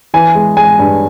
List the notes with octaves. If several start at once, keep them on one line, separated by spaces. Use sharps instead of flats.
E3 G#5
G#3
G#3 G#5
G2